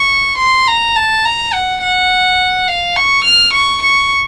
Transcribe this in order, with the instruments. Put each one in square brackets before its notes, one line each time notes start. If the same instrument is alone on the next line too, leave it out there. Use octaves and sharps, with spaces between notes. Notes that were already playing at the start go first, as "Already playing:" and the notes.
Already playing: [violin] C#6
C6
A#5
A5
A#5
F#5
F#5
F5
C#6
F6
C#6
C#6